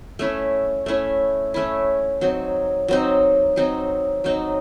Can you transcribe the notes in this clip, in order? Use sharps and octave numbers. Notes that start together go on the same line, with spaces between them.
A3 C#4 E4
A3 C#4 E4
A3 C#4 E4
F#3 C4 D#4
F#3 C4 D#4
F#3 C4 D#4
F#3 C4 D#4